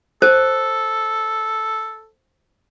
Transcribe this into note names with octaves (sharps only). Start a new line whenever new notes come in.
A4 C5